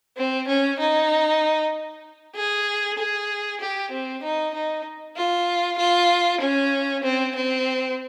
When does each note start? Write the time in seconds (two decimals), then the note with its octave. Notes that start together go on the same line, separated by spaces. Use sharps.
0.17 C4
0.48 C#4
0.79 D#4
2.35 G#4
2.99 G#4
3.61 G4
3.91 C4
4.23 D#4
4.54 D#4
5.17 F4
5.78 F4
6.41 C#4
7.04 C4
7.36 C4